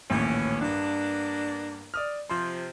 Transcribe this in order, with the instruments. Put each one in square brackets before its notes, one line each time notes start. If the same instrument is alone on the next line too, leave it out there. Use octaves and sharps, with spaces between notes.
[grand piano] A#1 D#2 A2 [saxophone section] E3 C#4
[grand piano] G2 [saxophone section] A#3 B3 D4
[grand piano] D5 D#6 F6
[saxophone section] C3 F3 [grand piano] C6